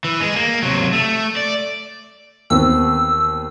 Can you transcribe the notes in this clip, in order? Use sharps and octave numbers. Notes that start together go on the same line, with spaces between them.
E3
G#3 G#4
A#3
C3 F#3
A3
D5
D#2 B3 C4 E6